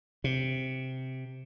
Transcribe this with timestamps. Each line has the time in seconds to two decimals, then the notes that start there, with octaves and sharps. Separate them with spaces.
0.24 C3